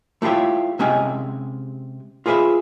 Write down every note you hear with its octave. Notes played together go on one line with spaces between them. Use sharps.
A3 E4 F4 G4 C#5
C3 G#3 C#4 G4 G#5
F4 G#4 B4 D5 E5